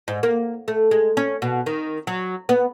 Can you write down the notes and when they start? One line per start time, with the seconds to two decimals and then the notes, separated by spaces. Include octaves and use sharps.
0.08 G#2
0.23 A#3
0.68 A3
0.91 G#3
1.17 C#4
1.42 B2
1.66 D#3
2.07 F#3
2.49 B3